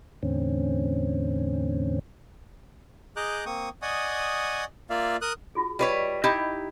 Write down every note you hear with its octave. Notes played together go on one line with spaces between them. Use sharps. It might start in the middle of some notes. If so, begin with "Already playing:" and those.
E2 A2 D3 C4 C#4
G#4 D#5 A#5 D6 F#6 G6
A#3 C4 C#6 D#6
D5 D#5 F#5 G#5 C#6 D#6
A#3 F4 D5 E5 F5
A#4 D#6 F#6
F4 F#4 G#4
G3 F4 B4 C#5 D#5
D#4 E4 G4 D#5 B5